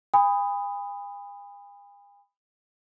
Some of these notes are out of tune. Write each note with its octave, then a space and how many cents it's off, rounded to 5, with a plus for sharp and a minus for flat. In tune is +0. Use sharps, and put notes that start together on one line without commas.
G#5 -45 B5 +20 D#6 +5